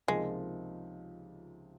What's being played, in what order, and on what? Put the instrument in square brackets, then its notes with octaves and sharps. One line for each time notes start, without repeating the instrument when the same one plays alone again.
[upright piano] C#2 C3 F3 A#3 D#4 [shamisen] G#3